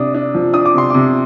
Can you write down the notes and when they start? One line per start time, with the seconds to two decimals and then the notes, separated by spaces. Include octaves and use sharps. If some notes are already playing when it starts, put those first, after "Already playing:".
Already playing: C3 D4 D#6
0.14 D4
0.34 F3
0.54 D4 D#6
0.66 D6
0.74 C3 C6
0.90 C3 D6